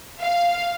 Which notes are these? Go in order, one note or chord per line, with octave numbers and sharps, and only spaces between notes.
F5